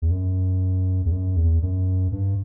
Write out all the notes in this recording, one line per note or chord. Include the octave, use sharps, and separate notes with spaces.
E2
F#2
E2
F#2
E2
F#2
G2